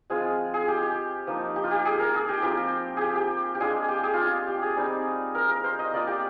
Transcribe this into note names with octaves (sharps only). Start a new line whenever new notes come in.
F3 G#3 C4 F4 G#4
G#4
G4
G4
F3 A#3 D#4
G4
F4
G4
G#4
A#4
G#4
G4
F3 C4 F4 G4
G4 G#4
G4
G4
G#3 D4 F4 G#4
G4
G#4
F4 G4
G4
G#4
G3 C4 D#4
A#4
A#4
C5
D#5
A#3 F4 D5
G4